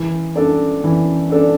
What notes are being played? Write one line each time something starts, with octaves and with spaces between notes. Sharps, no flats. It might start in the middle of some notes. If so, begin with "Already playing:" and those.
Already playing: E3
D4 A4 D5
E3
D4 A4 D5